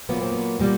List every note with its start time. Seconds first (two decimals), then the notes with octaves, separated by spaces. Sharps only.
0.09 A#2 F#3 A#3 B3
0.21 C4
0.32 B3
0.60 A#2 G3 A#3